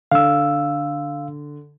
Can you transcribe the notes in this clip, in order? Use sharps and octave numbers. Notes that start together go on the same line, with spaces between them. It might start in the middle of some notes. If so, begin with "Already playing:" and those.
D3 F5 E6